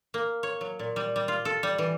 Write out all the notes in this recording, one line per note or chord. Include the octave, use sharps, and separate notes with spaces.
A#3
C#5
F#3
A#2
G3
G3
F4
A4
G3
E3